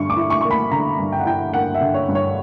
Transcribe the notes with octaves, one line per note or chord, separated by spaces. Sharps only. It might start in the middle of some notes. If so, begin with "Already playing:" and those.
Already playing: G2 D3 C#6
D6
E4
C#6
A#3 C#6
B5
D3 A#5
G2
G5
F#5
E4 G5
A#3 F#5
E5
D3
C#5
G2
C#5